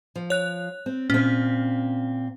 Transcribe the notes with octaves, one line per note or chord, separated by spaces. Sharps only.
F3
C#5 F#6
C4
A#2 C4 C#4